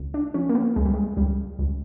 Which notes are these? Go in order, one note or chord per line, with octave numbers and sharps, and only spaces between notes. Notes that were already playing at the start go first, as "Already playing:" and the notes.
Already playing: C#2
D4
F3 C#4
A#3
B3
C#2 G#3
G3
G#3
C#2 G3
C#2